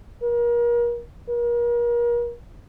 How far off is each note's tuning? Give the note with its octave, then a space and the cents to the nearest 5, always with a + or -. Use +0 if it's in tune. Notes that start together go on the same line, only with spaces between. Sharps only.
A#4 +35
A#4 +35